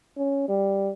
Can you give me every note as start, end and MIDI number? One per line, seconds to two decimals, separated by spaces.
0.18 0.46 61
0.49 0.91 55